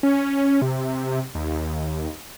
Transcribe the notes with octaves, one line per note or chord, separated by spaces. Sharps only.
C#4
C3
D#2